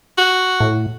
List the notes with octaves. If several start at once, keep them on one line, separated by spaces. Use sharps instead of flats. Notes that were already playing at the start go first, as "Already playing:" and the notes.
F#4
A2